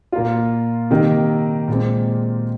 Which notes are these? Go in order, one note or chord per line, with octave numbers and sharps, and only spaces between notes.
A#2 A#3 F4
C3 D#3 A#3 D#4
A#2 G#3 C4